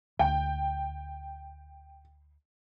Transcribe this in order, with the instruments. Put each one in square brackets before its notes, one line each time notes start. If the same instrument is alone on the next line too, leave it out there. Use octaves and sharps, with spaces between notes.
[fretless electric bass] D2 [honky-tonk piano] G5